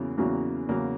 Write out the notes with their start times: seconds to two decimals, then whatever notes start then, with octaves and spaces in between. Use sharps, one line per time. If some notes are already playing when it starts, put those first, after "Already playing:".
Already playing: E2 C#3 F#3 A#3
0.18 E2 C#3 F#3 A#3
0.69 E2 C#3 F#3 A#3